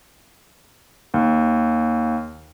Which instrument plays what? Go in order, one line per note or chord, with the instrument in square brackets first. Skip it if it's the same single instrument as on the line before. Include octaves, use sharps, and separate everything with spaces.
[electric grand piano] D#2